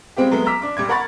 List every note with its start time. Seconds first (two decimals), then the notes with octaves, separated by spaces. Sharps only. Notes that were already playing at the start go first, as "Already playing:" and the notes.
0.17 G3 G#3 C4 F4 G4
0.31 F#3 G#3 A3 B3
0.46 A#5 D6 E6 B6
0.62 D4 D6
0.77 G1 G3 D6 G#6
0.89 A#4 F#5 A#5 B5 C#6 A6